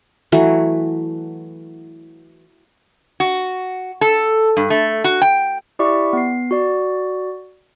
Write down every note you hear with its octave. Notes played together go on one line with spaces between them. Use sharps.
E3 F#3 A3
F#4
A4
G2
A3
F#4
G5
E4 G4 D5 E5 C#6
B3 C7
F#4 D5